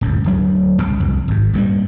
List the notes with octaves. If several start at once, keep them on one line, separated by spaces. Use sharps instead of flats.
D1 C#2 F#2
D1 D2 F#3 D4
C2 C#3
C2 F2
G#1 G#2
G2 A#2 D#3 G3